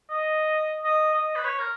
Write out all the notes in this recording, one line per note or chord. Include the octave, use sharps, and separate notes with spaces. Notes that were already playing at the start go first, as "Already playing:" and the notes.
D#5
D#5
D#5
B4
C#5
A#4